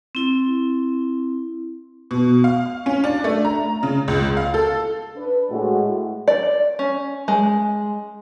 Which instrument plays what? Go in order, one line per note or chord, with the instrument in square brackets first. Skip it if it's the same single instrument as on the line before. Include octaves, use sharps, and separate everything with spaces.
[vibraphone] C4 E4
[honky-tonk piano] B2
F5
C#4
D4
A3
A#5
C#3
C#2
F5
A4
[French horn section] D4 B4
A2 G#3 F#4
[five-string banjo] D5
C#4
G#3